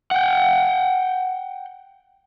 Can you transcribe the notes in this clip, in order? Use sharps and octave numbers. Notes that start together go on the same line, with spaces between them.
F#5 G5